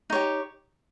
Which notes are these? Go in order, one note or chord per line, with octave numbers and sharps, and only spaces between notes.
D#4 G4 C#5